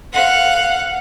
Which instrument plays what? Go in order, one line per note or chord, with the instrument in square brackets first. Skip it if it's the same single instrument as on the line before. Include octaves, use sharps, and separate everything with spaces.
[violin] F5 F#5